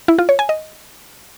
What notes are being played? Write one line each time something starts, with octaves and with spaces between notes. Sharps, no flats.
E4
F4
C#5
G#5
D#5